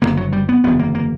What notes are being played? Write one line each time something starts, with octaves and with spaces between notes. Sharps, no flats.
F#1 E2 D3 A#3
F#3
G3
B3
F#1 E2 D3 B3
A#3
A#3